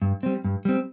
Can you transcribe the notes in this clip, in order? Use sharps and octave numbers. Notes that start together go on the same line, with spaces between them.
G2
G3 C4
G2
G3 C4